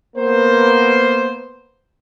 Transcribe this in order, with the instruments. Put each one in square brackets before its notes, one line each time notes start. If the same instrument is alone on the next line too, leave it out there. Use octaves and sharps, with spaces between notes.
[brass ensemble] A#3 B3 C5